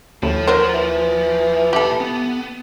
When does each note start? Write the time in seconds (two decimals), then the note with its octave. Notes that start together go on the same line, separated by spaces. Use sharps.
0.23 D#2 A2 F3
0.47 F#3 A#4 C5
0.74 E3
1.73 A#2 G4 A4 B5
2.00 B3